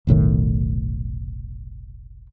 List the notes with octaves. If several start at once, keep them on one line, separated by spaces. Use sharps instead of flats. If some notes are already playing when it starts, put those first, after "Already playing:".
F1 B1 A2 D#3